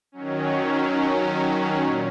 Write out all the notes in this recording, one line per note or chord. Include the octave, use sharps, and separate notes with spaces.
D#3 F#3 C#4
A#2